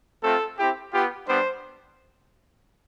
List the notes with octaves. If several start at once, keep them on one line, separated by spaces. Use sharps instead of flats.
A3 C4 F4 A4
C4 E4 G4
B3 F4 G4
G3 B3 D4 C5